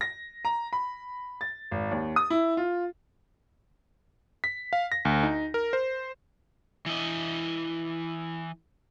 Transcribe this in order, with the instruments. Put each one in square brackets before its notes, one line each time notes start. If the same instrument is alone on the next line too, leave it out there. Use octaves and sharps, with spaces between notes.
[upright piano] A#6
A#5
B5
A6
G#1
D#2
D#6
E4
F4
[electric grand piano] B6
F5
A#6
D2
D#4
A#4
C5
[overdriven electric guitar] E3 D#5